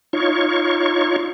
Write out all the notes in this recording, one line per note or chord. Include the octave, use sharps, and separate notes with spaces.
D#4 F4 C#5 C#6